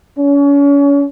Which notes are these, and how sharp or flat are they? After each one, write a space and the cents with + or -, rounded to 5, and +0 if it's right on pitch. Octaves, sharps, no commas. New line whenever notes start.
C#4 +35